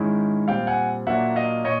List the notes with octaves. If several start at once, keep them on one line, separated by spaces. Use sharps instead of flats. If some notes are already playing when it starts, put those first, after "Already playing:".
Already playing: G#2 D#3 G#3 C#4 E4
A#2 G3 C4 F5 G5
F#5 G#5
A#2 F#3 A#3 D4 E5 F#5
D#5 F5
A#2 C#5 D#5